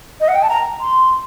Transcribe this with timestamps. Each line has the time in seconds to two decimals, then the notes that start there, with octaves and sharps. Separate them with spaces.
0.20 D#5
0.28 F#5
0.35 G5
0.42 A5
0.49 A#5
0.81 C6